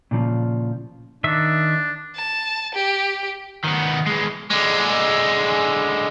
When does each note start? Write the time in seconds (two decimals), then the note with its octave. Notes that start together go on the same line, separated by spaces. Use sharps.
0.11 A#2 C#3 F3
1.24 D#3 D4 E5
2.16 A5
2.75 G4
3.65 D#3 B3
4.07 E3 G#3
4.50 D3 G#3